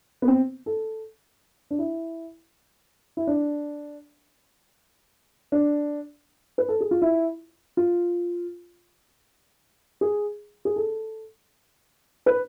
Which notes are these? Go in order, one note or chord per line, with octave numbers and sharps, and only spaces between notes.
B3
C4
A4
D4
E4
E4
D4
D4
B4
A4
G#4
F4
E4
F4
G#4
G#4
A4
B4